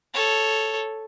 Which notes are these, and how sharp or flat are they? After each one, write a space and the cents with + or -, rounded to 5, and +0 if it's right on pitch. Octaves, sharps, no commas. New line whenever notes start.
A4 +0 C#5 +0